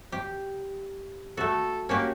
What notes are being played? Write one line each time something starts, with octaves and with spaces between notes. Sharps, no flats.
G4
A3 F#4 A4
A#3 C#4 F#4 G4